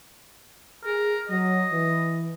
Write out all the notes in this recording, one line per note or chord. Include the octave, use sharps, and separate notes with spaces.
G#4 A#4
F#3 D#5
E3